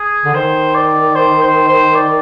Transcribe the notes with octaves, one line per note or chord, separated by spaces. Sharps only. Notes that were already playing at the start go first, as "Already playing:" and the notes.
Already playing: G#4
D3
D#3 C5
D5
C5
C5
C5
D5